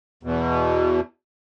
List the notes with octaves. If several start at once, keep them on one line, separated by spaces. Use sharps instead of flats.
E2 B2